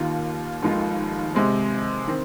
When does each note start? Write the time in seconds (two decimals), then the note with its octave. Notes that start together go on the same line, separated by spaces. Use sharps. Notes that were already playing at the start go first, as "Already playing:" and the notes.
Already playing: D#2 D#3 A#3 F4
0.62 F1 D#2 D#3 G#3 F4
1.35 C3 G#3 C4
2.08 D#3 C4